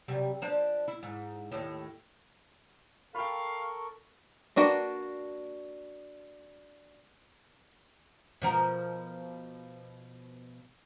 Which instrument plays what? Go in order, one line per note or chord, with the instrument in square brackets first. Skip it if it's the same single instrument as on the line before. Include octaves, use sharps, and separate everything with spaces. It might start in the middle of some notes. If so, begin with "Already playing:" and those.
[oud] F#2 C3 G3
F3 D4 C5
E4
G#2
D#2 A2
[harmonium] A4 A#4 [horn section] F5 [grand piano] G5 B5 [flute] C#6
[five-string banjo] A#3 D4 F#4 B4 G5
[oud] B2 F3 A#4